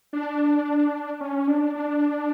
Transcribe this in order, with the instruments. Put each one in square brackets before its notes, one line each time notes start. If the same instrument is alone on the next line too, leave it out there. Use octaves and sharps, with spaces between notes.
[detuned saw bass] D4
C#4
D4
D4